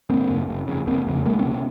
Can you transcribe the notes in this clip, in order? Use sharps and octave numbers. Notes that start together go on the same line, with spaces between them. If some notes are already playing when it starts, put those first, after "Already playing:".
G#1 A#3 C4
F#2 C#3
F#1
F2 C#3
F#1 A#3 C4
F2 C#3
C2 G#3 A#3
B3 C#4
C3
B3 C#4